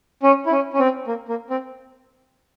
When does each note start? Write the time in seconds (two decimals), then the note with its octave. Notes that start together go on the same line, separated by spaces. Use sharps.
0.23 C#4
0.46 E4
0.52 C#4
0.73 C#4
0.79 C4
1.07 A#3
1.29 A#3
1.50 C4